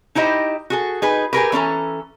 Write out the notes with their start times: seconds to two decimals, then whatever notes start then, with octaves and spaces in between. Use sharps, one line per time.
0.15 D#4 E4 G4 C5 D#5
0.70 F#4 G#4 A4
1.02 D#4 G#4 B4
1.33 G4 G#4 A#4 B4
1.52 E3 C#4 A4 A#5